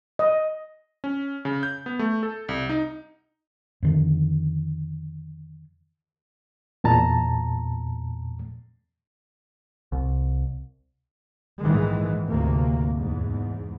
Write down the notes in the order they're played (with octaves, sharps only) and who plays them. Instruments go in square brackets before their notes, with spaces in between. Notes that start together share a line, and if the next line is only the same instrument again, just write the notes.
[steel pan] D#5
[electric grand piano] C#4
C#3
G6
B3
A3
A4
C2
D#4
[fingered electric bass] F2 D3 D#3
[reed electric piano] E2 A#2 A5 A#5
[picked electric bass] C2
[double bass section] A#1 G#2 D#3 E3 G#3
D2 G#2 C3 A#3
E2 G#2